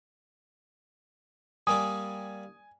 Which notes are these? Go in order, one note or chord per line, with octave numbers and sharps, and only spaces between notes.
G3 A#3 D5 G#5 D#6